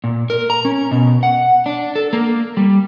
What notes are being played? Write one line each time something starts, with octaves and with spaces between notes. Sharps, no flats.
A#2
A#4
A#5
C#4
B2
F#5
D4
A4
A#3
G3